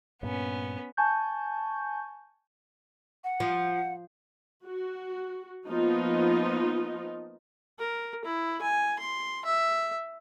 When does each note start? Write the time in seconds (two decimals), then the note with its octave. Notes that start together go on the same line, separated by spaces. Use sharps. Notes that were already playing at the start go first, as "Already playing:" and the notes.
0.23 G2 A#2 B3 C#4
0.97 G#5 A5 C#6 G6
3.24 F#5
3.40 F3
4.65 F#4
5.69 F3 A#3 B3 D#4 F4 D#5
7.79 A#4
8.25 E4
8.62 G#5
8.99 C6
9.45 E5